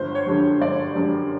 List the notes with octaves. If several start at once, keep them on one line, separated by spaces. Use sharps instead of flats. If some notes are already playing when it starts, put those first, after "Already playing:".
Already playing: G1 C5
C#5
F#2 D3 G3
G1 D5
F#2 D3 G3